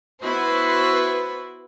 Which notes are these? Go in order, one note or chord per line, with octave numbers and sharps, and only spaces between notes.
B3 E4 F#4 B4 C5